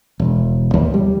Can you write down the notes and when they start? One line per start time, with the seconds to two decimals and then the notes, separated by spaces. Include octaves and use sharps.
0.20 E1
0.74 D#2
0.94 G3